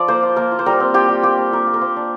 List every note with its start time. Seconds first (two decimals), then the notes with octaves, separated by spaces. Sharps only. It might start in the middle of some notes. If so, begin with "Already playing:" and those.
Already playing: F3 D5
0.08 A#3 C5
0.23 F4
0.36 A#3 A#4
0.52 F4
0.59 C5
0.66 G3 A#4
0.80 C4
0.94 F4 G4
1.08 G3
1.23 A#3 G4
1.38 D4
1.52 F4 A#4
1.67 A#3
1.74 A#4
1.81 A#3 C5
1.96 D4